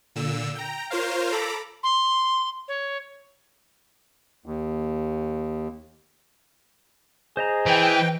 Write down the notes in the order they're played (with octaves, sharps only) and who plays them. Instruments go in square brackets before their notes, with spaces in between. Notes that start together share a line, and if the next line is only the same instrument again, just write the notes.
[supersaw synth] A#2 D3 E6
G5 A#5
F4 A#4 C5 C#5 F5
A4 A#5 B5 D6
[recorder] C6
C#5
[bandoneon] D#2
[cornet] G#4 [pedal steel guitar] C5 D#5 A#5
[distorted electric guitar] E3 [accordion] G5